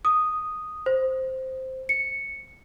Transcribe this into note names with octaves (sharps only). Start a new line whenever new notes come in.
D#6
C5
C#7